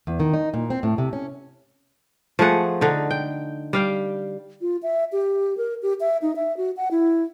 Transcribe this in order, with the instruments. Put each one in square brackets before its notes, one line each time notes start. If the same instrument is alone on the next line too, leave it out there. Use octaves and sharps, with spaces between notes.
[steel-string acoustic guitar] E2
D#3
D#4
A#2
C4
A2
C3
C#4
[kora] F3 A3 G#4 F#5
D3 D#4
G5
G3 F5 G5
[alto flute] F4
E5
G4
A#4
G4
E5
D#4
E5
F#4
F#5
E4